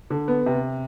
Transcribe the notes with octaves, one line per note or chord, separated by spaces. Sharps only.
D3
B3
C3